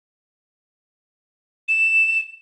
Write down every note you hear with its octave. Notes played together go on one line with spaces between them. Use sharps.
E7